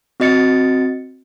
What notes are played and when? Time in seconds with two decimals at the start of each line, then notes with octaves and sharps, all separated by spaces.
0.20 C4 F#4 D#5 A6 C#7